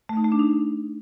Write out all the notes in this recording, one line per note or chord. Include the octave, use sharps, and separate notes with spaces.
A3
D#4
A3
D4
D#4